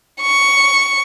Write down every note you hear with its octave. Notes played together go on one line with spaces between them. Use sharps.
C#6